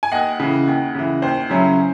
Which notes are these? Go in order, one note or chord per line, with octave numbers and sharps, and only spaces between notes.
G#5
D#2 D#5 F#5
C#3 E3
D#2
C#3 E3
D#2 C5
C#3 F#3 C#4 E4